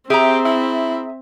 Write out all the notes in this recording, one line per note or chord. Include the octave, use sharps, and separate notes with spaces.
C4 G4 G#4 E5 A#5
E4